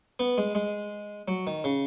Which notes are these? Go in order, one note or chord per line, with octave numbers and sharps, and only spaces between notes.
B3
G#3
G#3
F#3
D#3
C#3